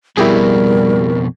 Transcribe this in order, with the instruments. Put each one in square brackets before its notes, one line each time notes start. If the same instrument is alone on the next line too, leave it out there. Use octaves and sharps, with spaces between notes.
[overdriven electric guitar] F2 B2 [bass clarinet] G3 [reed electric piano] E4 G4 G#4 [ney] A#4